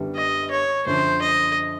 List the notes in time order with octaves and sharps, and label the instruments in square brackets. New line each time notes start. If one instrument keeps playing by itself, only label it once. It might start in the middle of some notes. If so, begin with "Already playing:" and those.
Already playing: [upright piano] F#2 D3 G3 B3 E4
[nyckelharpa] D#5
C#5
[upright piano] F#2 D3 F3 [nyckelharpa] C5
[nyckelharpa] D#5